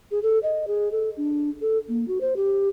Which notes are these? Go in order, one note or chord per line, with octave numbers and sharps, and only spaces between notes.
G#4
A4
D#5
G#4
A4
D4
A4
A#3
F#4
C5
G4